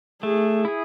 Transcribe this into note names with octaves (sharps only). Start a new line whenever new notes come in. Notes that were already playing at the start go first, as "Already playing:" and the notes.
A3 G#4
E4 G#4